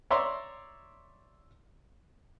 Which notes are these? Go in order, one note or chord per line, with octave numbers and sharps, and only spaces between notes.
C#5 D5 E5 A#5 C6